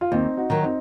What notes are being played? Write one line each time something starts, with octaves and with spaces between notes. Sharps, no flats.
F4
D#2 C4 D#4
D#4 F#4
D#3 F#3
C4 D#4